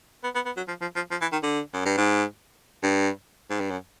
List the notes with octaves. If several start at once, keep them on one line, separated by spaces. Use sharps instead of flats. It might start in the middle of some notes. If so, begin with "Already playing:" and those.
B3
B3
B3
F#3
F3
F3
F3
F3
E3
D#3
D3
F#2
G2
G#2
G2
G#2
G2
F#2